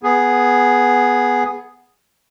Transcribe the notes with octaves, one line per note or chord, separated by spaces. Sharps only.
B3 G#4